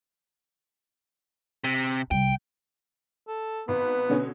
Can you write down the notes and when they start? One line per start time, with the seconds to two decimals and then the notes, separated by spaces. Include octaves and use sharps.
1.64 C3
2.11 C2 G3 G5
3.28 A4
3.68 G#1 B3 B4
4.10 B2 D3 C#4